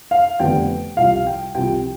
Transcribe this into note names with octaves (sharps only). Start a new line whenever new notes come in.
F5
F1 F2 D3 G3 B3 G5
C2 C3 F3 F5
G5
C2 C3 F3 G5